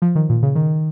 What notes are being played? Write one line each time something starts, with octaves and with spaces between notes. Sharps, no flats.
F3
D#3
A#2
C#3
D#3